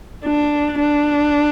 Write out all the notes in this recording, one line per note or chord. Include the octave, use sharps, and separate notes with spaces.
D4
D4